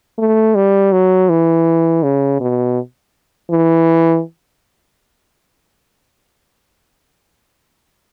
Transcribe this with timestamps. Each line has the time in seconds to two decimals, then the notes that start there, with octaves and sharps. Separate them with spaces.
0.19 A3
0.55 G3
0.92 F#3
1.30 E3
2.03 C#3
2.41 B2
3.51 E3